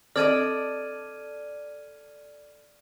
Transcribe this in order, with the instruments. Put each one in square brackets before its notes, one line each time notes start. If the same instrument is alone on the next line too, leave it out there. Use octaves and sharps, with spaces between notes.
[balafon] C4 [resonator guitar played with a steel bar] A4 D#5 [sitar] D5 [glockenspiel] F6 G#6 D#7